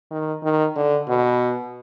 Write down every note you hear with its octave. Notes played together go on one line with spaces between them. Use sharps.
D#3
D#3
D3
B2